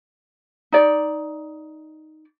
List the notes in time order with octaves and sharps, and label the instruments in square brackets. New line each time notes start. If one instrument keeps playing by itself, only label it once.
[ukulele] D#4 D5